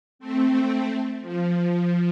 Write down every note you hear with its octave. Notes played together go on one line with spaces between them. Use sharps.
A3 C4
A3 C4
F3